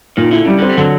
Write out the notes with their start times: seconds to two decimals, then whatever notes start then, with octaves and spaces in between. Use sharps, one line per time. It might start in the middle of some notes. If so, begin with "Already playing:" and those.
0.17 A#2 D#3
0.31 D3 E4
0.45 C#3 G3
0.59 D3 C4
0.69 G3
0.78 D3 F#3